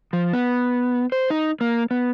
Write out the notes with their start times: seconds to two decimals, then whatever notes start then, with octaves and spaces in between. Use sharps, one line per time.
0.13 F3
0.33 B3
1.12 C5
1.30 D#4
1.61 A#3
1.91 B3